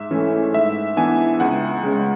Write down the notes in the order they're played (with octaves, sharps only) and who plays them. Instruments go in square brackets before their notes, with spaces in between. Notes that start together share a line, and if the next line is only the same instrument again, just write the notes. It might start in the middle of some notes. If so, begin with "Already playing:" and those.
Already playing: [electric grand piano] G#2 E5
E3 A3 C#4
G#2 E5
E3 B3 D4 G#5
C#2 F#5
C#3 G#3